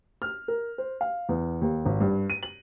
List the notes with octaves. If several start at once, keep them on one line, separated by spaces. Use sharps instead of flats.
F6
A#4
C5
F5
E2
D#2
G#1
G2
D#7
F#7